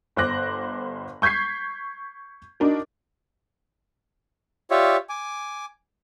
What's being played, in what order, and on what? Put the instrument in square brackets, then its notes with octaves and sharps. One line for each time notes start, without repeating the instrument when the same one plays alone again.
[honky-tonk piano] G1 C5 D6 F#6 A#6
C#6 G6 G#6 B6 C7
D4 D#4 F#4 A#4
[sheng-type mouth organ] F4 G4 C#5 D5 E5
G#5 D6